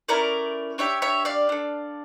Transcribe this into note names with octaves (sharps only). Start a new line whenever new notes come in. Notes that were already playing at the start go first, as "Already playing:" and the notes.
A3 C#4 E4 A#4 D5
D4 G4 C#5 E5
C#5 E5
D5 F5
D4 A4